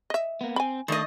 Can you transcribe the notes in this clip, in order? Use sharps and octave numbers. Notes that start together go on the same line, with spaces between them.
D#5 E5
A#3 B3
C4 G#5 B5
D#3 A3 D4 D#5